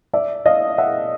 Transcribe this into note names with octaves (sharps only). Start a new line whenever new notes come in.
D5 E5
D#5 F5
E5 F#5